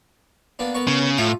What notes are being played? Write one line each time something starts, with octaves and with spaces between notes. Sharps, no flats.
A#3 B3 D4
B3 A#4 C#6
C#3
A2 F4 E5